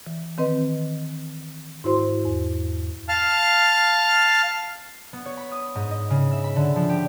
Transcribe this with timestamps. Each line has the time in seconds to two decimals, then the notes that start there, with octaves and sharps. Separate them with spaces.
0.06 E3
0.38 D#3 C4 B4 D#5
1.84 G#2 E4 F#4 C5 C6
2.25 E2
3.09 F5 A5 F6
5.13 B3
5.26 C#5
5.37 B5
5.52 D#6
5.75 G#2
5.91 D#5
6.10 C#3
6.31 E5
6.44 B5
6.56 D3
6.76 F3
6.89 G4